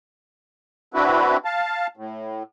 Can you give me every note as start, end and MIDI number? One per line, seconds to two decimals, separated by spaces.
0.94 1.37 60
0.94 1.37 62
0.94 1.37 64
0.94 1.37 66
0.94 1.37 71
1.45 1.87 77
1.45 1.87 81
1.97 2.43 45